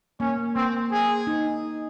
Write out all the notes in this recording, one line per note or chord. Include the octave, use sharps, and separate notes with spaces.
A#3 C#4
A#3 C4
G#4
D#4